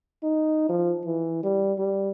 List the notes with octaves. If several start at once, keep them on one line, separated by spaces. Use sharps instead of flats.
D#4
F3
E3
G3
G3